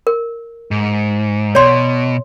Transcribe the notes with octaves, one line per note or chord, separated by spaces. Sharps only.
A#4
G#2
B2 C#5 D5 C6